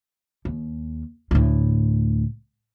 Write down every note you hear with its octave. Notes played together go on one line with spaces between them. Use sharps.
D#2
D2 A2